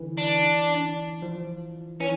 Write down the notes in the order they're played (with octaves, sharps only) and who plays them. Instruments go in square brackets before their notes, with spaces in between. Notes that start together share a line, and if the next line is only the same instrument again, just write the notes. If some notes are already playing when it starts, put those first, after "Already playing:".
Already playing: [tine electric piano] D3 E3
[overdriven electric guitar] D4
[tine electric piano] F3
[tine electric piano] E3 [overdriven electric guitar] C#4